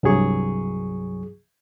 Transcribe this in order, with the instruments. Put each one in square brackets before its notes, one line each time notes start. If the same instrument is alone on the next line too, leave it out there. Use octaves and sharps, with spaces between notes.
[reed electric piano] C2 G2 F#3 G#4 C#6